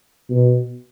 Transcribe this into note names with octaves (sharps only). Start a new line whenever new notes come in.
B2